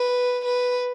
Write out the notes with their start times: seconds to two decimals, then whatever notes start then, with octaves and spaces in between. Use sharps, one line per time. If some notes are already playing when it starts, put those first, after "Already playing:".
Already playing: B4
0.45 B4